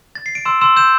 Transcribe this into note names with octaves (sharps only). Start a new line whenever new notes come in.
A6
C7
D7
C6 E6 E7
C6 E6 E7
E6 G6 E7